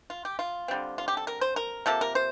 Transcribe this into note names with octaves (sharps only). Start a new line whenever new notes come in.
F4
G4
F4
D3 G3 C4
F4
G4
A4
A#4
C5
A#4
C3 F3 A#3 A4
A#4
C5